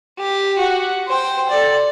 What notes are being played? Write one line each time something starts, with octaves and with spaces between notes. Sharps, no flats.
G4
F#4
C5 G5
A4 D5